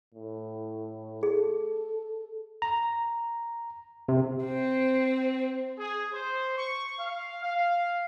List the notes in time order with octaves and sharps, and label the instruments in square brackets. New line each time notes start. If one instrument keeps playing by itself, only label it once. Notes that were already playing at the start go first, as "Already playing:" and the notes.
[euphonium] A2
[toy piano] G#4 [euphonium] A4
[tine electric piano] A#5
C3
[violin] C4
[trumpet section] G#4
C5
C#6
F5
F5